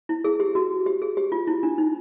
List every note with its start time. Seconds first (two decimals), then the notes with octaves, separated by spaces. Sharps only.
0.09 E4
0.24 G#4
0.40 G4
0.55 F#4
0.86 G4
1.02 G#4
1.17 G4
1.32 F4
1.47 E4
1.63 D4
1.78 D#4